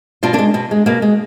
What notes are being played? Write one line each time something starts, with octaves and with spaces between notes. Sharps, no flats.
B2 D4 F4
A#3 D4
G#3
B2
G#3
B2 A#3
G#3